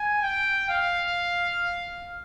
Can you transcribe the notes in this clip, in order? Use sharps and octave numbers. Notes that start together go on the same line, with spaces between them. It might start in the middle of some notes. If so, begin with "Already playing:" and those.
Already playing: G#5
G5
F5